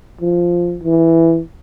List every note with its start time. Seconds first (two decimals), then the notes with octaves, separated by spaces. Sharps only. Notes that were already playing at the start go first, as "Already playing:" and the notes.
0.21 F3
0.83 E3